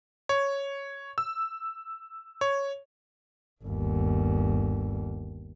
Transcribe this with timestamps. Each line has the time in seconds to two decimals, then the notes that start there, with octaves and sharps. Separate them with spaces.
0.29 C#5
1.18 E6
2.41 C#5
3.63 G1 D#2